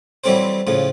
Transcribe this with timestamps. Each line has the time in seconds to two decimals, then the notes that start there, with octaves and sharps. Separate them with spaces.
0.24 E3 F#3 G3 C4 A4 C5
0.67 A2 C#3 F3